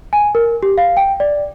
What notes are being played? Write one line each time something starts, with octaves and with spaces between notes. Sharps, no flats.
G#5
A#4
G4
F5
G5
D5